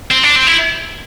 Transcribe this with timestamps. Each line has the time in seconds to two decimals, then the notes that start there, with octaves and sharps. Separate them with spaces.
0.11 C4
0.23 D4
0.36 C4
0.47 E4